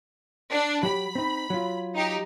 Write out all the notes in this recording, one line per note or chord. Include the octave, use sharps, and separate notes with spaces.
D4
F#3 G4 B5
C4 D#4
F#3 F4
D#4 G4